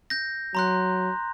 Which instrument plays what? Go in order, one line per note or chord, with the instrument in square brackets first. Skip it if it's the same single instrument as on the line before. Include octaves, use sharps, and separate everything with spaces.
[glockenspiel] G6 A#6
[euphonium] F#3 [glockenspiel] A#5 C6 F#6